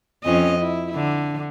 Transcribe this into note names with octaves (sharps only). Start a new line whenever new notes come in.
F2 C#4 D#5
E4
D3